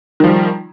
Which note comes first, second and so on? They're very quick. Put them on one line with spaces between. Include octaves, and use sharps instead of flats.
D#3 F3 G3